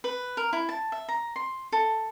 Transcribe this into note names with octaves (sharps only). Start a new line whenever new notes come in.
B4
A#4
E4
A5
E5
A#5
C6
A4